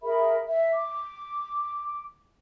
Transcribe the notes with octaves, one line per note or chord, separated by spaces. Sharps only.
G#4 A#4 E5 B5
E5
D6